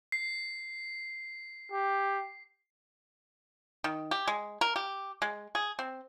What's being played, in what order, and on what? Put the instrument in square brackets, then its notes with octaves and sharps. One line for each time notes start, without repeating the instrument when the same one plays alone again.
[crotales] C7
[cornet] G4
[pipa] D#3
G4
G#3
A#4
G4
G#3
G#4
C4